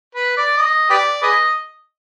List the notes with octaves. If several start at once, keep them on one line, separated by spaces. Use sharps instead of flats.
B4
D5
D#5
G4 B4 D5
G#4 B4 D#5